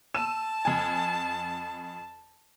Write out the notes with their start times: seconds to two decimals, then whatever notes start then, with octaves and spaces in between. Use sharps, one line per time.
0.15 A5 E6 D#7 E7
0.65 F2 G#5